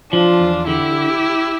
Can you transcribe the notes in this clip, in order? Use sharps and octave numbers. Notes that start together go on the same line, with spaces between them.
F3 D4 F4
E2
D3 E4 G4